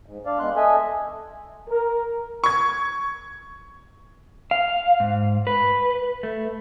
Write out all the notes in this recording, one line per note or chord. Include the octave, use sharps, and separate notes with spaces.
G#2
D4 D5 F5
G#3 B3 C6 F#6
A4 D#5 E5 G#5
A#4
C#6 G#6
F5
G#2
B4
A3